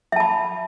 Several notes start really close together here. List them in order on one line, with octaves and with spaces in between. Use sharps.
E5 A5 B5